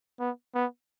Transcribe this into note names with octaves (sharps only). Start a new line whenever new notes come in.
B3
B3